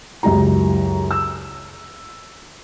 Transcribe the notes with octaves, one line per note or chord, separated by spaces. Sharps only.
C#2 F#2 E4 G4 A#5
E6